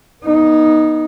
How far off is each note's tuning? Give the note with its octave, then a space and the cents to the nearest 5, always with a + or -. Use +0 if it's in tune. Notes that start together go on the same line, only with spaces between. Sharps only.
B3 -35 D#4 +0